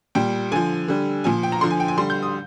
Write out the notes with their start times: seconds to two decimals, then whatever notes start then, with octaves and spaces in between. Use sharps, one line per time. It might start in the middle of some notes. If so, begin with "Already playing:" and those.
0.15 A#2 G3 G5
0.52 D3 F3 G#5
0.88 D3 G3
1.24 A#2 F3 G#5
1.43 G5
1.52 A#5
1.61 D3 F3 C6
1.71 G#5
1.80 G5
1.88 G#5
1.98 D3 G3 C6
2.10 G6
2.23 D#6